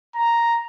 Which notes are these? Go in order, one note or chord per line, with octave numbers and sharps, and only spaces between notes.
A#5